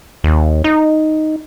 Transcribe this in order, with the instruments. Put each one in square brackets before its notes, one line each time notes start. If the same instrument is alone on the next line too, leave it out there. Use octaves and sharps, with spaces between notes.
[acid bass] D#2
D#4